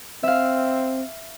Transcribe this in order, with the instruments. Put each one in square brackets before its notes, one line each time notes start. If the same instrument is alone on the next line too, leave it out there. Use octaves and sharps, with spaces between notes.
[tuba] C4 [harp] E5 F5